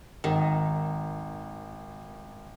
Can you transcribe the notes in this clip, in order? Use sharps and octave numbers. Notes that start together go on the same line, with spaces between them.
G#1 D#3